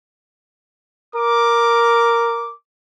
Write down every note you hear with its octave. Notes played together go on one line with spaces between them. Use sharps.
A#4 D6